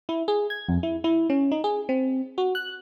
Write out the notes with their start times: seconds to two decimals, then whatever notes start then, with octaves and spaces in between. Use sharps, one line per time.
0.09 E4
0.28 G#4
0.50 G#6
0.69 F2
0.83 E4
1.04 E4
1.30 C#4
1.51 D#4
1.64 G#4
1.89 C4
2.38 F#4
2.55 F#6